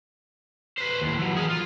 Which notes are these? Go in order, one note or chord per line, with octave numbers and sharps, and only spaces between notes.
B4 C5
D#2 A2
E3 F#3
G#4 A#4
F4